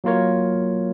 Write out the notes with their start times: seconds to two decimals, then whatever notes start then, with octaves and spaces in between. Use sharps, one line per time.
0.04 F#3 A#3 F4 A#4 C#5